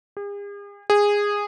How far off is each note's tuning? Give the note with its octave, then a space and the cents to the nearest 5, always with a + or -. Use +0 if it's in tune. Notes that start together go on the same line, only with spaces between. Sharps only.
G#4 -45
G#4 -15